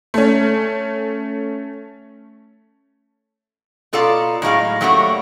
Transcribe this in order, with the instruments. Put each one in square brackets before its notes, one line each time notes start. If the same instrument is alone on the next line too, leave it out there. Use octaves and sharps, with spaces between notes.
[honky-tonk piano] A3 C#4
[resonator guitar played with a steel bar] B2 F4 A4 D5 F5 A#5
A2 F#3 G#3 F5
F#3 G3 A3 A#3 D4 F#4